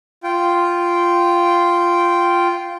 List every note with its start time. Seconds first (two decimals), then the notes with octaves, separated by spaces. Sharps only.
0.23 F4 G5